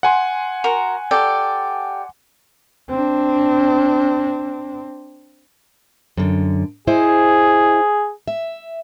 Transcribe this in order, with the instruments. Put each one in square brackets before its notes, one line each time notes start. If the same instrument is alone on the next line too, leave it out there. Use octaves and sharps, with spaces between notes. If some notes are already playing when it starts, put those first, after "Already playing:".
[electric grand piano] F#5 G#5 C6
[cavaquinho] F#4 A#4
G4 A4 D5
[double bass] C4 D4
[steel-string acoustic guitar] F#2 D3
[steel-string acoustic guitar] E4 C5 D#5 [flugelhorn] G#4
[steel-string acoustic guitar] E5